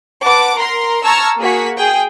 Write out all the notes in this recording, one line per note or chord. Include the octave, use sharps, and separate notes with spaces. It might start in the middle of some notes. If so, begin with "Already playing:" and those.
B4 F#5 A5 D6
A#4 A#5 C6
A5 A#5 C#6 E6 F6 G#6
A#3 F#4 G#4 B6
G#4 G5